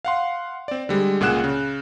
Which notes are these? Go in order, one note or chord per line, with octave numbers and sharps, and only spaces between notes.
F5 F#5 C6
C4 D5
D3 G3 G#3
C#2 A#2 G#4 F#5 F#6 E7
C#3